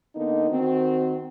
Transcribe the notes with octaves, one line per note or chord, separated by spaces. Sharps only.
D3 A#3 B3 D#4
D#3 C4 F#4